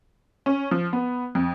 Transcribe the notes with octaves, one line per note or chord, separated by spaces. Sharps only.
C#4
F3
B3
F2